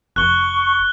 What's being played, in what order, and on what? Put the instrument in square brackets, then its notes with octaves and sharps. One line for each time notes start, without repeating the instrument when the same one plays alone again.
[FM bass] F1 [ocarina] C#6 [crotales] F#6 G7